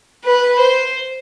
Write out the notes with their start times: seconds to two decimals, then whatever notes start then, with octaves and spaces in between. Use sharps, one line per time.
0.25 B4
0.59 C5